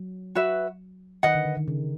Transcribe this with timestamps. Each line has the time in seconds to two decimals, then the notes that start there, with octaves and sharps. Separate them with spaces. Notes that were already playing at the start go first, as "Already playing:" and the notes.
Already playing: F#3
0.35 F#4 B4 E5
1.23 D#3 B4 D#5 F#5
1.35 D3
1.45 D3
1.57 D#3
1.68 C#3